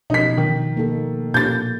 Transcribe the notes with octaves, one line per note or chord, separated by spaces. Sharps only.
B2 F3 D#4 A#4 B6
D#3
A#3 D#4 A4
A#2 G6 A6